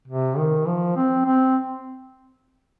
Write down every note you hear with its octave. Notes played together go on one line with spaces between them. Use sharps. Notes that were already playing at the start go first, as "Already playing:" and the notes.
C3
D#3
F3
C4
C4